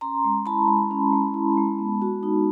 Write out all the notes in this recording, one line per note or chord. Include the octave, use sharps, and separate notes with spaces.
C#4 A#5 C6
G#3
E4 A5 B5
G#3
C#4
G#3
E4
G#3
B3
F#4
D#4